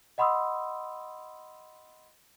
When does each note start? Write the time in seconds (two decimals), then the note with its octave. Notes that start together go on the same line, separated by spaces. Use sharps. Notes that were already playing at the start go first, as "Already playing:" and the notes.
0.18 D#5 F#5 B5 C6 D#6 E6